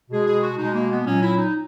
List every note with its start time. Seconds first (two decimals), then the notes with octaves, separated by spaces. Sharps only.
0.10 B2 G#3 G#4
0.27 G#4
0.42 F#4
0.58 B2 G#3 D#4
0.74 A#3
0.90 B3
1.06 A#2 F#3 C#4
1.22 E4
1.37 D#4